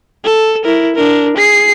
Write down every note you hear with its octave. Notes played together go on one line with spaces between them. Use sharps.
A4
E4 A#4
D4 A#4
G#4 C7